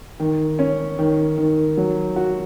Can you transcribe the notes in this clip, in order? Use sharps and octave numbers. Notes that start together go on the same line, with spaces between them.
D#3
C#4
D#3
D#3
F#3
F#4